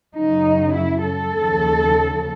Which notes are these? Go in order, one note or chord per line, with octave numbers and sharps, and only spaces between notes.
F#2 C#3 F#3 D#4
E4
A4
D#2 C#3 F3